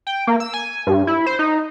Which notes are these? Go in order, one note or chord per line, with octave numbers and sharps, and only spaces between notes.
G5
A#3
E6
G#5
G2
E4
C5
D#4